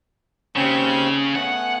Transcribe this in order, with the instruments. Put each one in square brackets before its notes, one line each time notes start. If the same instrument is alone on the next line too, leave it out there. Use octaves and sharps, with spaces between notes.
[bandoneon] D#2 C4 G6 [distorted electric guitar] C#3 [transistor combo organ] C#4
[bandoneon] A3 B3 G#5 [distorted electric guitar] F#5